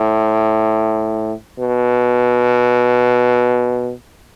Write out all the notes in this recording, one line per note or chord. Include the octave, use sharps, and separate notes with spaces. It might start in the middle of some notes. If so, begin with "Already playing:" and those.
Already playing: A2
B2